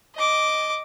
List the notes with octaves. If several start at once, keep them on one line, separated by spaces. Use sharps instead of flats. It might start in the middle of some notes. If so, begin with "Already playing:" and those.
D#5 D6